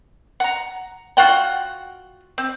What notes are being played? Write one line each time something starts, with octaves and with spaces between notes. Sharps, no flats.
F#5 A#5
F4 F#4 F#5 G5
C4